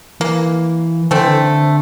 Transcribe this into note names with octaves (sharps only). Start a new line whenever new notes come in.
E3 A#3
D3 A3 C4
E3
D3